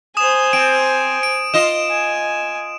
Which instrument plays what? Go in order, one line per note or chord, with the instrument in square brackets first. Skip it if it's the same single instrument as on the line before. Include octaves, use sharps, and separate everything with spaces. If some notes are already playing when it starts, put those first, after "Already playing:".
[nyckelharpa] C5 G#5 [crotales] D#6 E7
[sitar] C4 [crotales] D7
[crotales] D7
[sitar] F4 D#5 [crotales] E7
[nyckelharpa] G#5